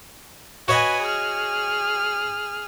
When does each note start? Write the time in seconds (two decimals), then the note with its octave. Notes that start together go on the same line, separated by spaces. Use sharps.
0.68 F#4 B4 C#5 D#5 G#5
1.02 G#4 F6